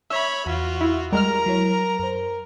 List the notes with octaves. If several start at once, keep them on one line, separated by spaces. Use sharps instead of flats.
C#5 E5 B5
E2 F4 F#4
E4
G3 G#3 A#4 A#5 F6
F#3 E4 C#5
F#2 A#4 C5